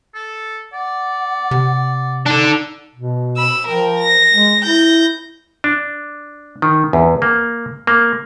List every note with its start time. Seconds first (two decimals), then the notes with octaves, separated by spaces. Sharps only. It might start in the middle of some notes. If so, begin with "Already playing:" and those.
0.14 A4
0.73 D5 F#5
1.51 C3
2.27 D4 D#4 A4
2.95 B2
3.37 B5 E6
3.68 F3 A#4 G5
3.98 A#6
4.33 G#3
4.63 E4 G6 A#6
5.64 D4
6.62 D#3
6.93 E2
7.22 A#3
7.87 A#3